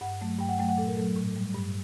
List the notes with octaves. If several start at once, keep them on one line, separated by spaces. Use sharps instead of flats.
G2 F#5
F#3 A3
G2 G5
F#5
F#3 A3 G5
F#5
A#2 A4
A#4
F#3 A3 A4
A2
G3
G2